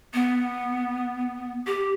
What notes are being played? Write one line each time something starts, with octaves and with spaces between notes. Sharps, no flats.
B3
G4